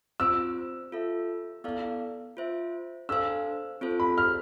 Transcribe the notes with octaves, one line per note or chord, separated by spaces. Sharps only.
C4 F4 C5 E6
F4 A4 E5
B3 E4 A4 D5 F5
F4 C5 E5
D4 A4 C5 F5 E6
C4 F4 A4 C5
B5
F6